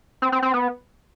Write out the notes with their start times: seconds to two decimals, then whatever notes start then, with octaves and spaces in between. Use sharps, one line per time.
0.22 C4
0.32 C4
0.42 C4
0.54 B3